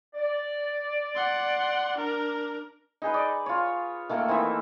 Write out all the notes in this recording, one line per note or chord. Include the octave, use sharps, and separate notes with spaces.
D5
F#5 C6
D4 A#4
D#4 G#4 B4
D5
F4 C#5
D#3 A3 A#3
E3 C4 D#4 E5